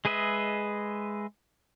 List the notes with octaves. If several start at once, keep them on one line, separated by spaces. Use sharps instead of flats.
G#3 G#4 B4 D#5 E5